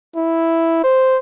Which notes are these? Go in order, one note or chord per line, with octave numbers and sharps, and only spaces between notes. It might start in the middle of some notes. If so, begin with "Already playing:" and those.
E4
C5